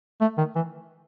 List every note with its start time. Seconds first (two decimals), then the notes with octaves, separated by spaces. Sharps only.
0.21 A3
0.38 D#3
0.55 E3